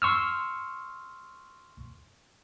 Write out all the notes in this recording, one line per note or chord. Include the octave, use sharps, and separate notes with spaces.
C6 C#6 E6 F6